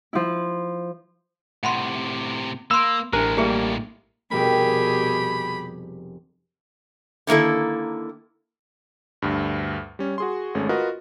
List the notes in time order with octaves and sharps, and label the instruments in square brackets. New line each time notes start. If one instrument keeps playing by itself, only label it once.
[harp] F3 E4
[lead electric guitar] A2 C3 [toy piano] F#5 B5 C6
[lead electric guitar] A#3 [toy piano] B5 C6 [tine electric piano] E6
[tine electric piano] A1 [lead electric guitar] A2 G#3 [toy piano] D4 C5 [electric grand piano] A#4
[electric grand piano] G3 A#3 [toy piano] E4 G#4 E5
[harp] F1 G3 A#4 [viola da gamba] B2 G4 G#4 [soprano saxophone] B5
[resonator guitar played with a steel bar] D3 D#3 A#3 E4 A4
[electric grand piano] D2 G2
G3 C#4
F#4 G#4 C6
G#1 G#3 A3 C#4
F4 F#4 A#4 B4 D#5